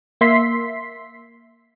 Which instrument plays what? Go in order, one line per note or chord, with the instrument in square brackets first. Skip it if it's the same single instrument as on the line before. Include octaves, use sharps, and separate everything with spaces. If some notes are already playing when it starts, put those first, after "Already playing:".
[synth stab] A#3 E5 C6 B6 C7